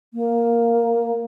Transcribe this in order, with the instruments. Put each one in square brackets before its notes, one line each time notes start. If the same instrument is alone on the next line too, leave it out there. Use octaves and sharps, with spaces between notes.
[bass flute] A#3